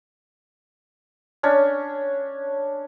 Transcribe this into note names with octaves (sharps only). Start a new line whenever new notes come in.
C#4 D4 C#5